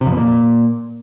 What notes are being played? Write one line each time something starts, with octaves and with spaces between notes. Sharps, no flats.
C3
F2
B2
A#2